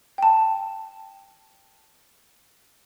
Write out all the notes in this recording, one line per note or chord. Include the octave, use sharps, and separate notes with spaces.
G5 A5